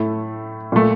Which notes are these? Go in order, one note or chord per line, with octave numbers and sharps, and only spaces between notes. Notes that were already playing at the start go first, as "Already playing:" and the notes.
Already playing: A2 A3
A#2 A3